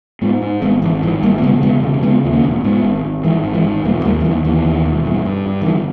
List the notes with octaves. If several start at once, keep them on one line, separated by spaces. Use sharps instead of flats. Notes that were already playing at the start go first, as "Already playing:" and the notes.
G#2 G#3 B3
G#2
G#1 G#3 B3
G#1 E3
G#2 E3 G#3
G#1 G3 A#3
A#3
C#3 G#3 B3
E1 G#3 B3
C#3
C#3 G#3 B3
D#2
A#3 C#4
E1
G#2 G#3 B3
G#1
G#1
G#2 E3 G#3
G#1
E3 G#3
G#2
E1 G3 A#3
B3
D#2 G3 A#3
G3
D#2 E3
D#2 E3
D#2
E1
G2
G2
G2
D#3
G1 E3